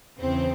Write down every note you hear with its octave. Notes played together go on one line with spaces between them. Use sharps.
E2 C#3 E3 C4